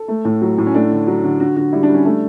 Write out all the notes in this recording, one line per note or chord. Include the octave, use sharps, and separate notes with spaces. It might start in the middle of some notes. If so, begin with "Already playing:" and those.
Already playing: A4
A3
A2
F#3
A2
C#4
A3 D4
D3
F#3
D3
D3 F#4
D3 F#4
G3 E4
D4
G3
C#4
A3 D4